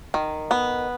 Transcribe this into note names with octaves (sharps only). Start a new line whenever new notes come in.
D#3
B3